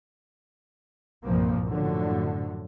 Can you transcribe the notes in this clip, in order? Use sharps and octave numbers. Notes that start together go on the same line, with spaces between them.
C2 G2 A#2 F3 A#3
F#2 A2 D3 F3 F#3